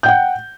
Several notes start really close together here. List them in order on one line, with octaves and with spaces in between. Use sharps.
G6 G5 F#5